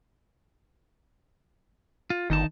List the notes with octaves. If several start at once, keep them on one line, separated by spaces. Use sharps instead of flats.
F4
G1 D#3 D#4 A5